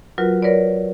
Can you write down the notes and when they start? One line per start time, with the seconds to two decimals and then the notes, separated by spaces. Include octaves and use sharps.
0.18 F#3 F4 F#4 A#4 B4
0.42 A#4 B4 C#5 D5